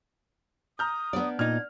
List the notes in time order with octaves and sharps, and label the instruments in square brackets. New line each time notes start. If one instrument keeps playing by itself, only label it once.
[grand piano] A#5 F6 G6 [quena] D#6
[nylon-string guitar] B3 D4 D5
[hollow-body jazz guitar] A#2 D#4 [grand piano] F6 [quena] G#6